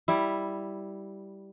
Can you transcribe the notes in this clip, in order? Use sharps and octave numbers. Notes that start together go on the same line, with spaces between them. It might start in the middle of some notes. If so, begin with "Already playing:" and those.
G3 E4